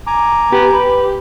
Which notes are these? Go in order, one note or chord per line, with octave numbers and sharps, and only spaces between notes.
G#5 A#5 D6
B3 G4
B4